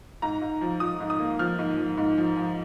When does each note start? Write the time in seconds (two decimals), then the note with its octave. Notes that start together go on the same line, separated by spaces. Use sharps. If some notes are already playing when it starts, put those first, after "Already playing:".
0.22 G#2 A#5
0.41 G#2
0.61 F3
0.80 F3 D#6
1.00 G#2
1.10 D#6
1.19 A#3
1.39 F3 F6
1.59 G#2
1.77 F3
1.98 G#2
2.17 F3
2.37 F3